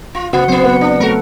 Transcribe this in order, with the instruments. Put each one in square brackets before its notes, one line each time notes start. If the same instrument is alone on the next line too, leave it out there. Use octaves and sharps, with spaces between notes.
[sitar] F4
[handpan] C#3 F#4 F#5 [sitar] A#3
[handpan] F#3 C4 [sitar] A#3 C5
[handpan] B3 B4 F#5
[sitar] D4
[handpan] A3 A4 [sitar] F#4 A#4